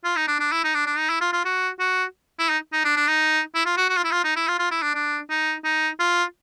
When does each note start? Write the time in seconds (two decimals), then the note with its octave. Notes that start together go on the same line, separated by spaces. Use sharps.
0.04 F4
0.16 D#4
0.28 D4
0.40 D4
0.52 E4
0.64 D#4
0.74 D4
0.86 D4
0.98 D#4
1.09 E4
1.21 F4
1.33 F4
1.45 F#4
1.80 F#4
2.39 E4
2.49 D#4
2.73 D#4
2.84 D4
2.96 D4
3.08 D#4
3.55 E4
3.66 F4
3.77 F#4
3.89 F#4
3.97 F4
4.04 E4
4.11 F4
4.24 D#4
4.36 E4
4.48 F4
4.59 F4
4.71 E4
4.82 D4
4.94 D4
5.30 D#4
5.64 D#4
5.99 F4